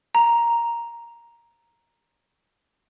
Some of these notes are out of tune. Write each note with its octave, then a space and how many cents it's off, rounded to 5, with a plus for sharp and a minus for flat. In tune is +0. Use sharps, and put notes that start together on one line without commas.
A#5 +5